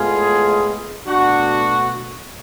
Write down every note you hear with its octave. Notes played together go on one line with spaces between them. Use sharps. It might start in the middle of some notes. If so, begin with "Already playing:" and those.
Already playing: A2 G#3 B3 F4 G#4
B2 A3 D4 F#4